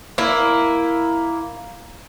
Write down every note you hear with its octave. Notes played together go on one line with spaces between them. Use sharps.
A#3 E4